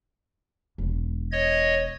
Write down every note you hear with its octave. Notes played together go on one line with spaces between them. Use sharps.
E1
C#5 D#5 G#6